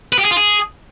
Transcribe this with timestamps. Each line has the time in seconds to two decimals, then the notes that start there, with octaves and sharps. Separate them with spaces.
0.13 B4
0.19 G4
0.25 G#4
0.31 F4
0.37 G#4